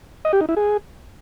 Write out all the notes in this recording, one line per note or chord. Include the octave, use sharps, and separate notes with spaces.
D#5
G4
D#4
E4
G#4